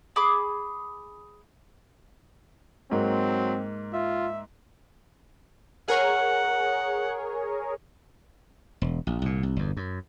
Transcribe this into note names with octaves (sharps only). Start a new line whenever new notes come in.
G#4 B5 D6
G#2 F#3 A#3 C4
F4 E5
G#4 A#4 C#5 F#5
E1
A#1
C2 A#2
C2
G1 E2
F#2